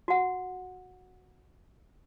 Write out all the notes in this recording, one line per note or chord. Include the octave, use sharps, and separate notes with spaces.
F#4 F#5